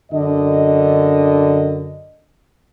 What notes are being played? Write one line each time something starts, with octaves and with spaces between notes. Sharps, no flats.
F#2 D3 D#5